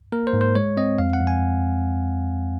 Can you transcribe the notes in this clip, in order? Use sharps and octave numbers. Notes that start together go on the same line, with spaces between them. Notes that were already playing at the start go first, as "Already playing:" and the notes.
A#3 A#4
C5
G#2
C5
G#3 C#5
C4 D#5
F2 F5
F#5
F2
G#5